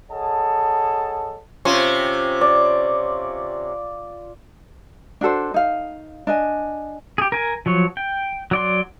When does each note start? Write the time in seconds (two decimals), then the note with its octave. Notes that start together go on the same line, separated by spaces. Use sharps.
0.11 G#4 A4 C#5 D#5 F#5 A5
1.65 C3 C#4 F4
2.41 D5
5.21 D4 F#4 A4 C5
5.54 D#4 F5
6.27 D4 D#5 G#5
7.18 G4 G#4
7.32 A#4 G#5
7.66 F3 F#3 C#5
7.97 G5
8.51 F#3 D5 C6